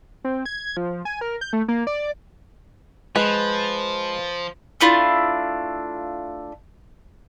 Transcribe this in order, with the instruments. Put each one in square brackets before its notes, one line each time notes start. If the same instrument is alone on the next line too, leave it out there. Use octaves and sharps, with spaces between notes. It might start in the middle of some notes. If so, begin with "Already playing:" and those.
[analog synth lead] C4
G#6
F3
G#5
A#4
G6
A3
A#3
D5
[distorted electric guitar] F3 [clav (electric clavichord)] G#3 [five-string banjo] B4
[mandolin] A3 D4 E4 F4